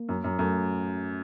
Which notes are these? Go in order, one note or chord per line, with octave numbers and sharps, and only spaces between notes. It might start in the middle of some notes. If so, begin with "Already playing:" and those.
Already playing: A#3
F#2
F#2
F#2 A3